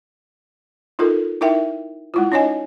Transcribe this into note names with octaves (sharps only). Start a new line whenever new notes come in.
D#4 F4 A4 A#4
D#4 E4 A#4 E5 G5
G#3 E4 F4
C#4 D#4 C#5 D#5 G#5